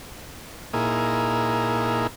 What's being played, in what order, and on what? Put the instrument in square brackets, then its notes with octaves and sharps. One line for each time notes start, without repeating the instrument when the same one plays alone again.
[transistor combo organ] A#2 A#3 D#4 E4 G#4